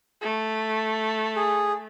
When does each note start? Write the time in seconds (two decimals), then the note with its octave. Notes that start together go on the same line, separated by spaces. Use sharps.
0.21 A3
1.36 G#4